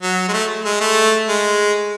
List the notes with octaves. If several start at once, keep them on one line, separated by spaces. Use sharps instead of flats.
F#3
G#3
A3
G#3
A3
G#3